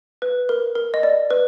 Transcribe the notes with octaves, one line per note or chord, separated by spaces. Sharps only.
B4
A#4
A#4
D#5
D5
B4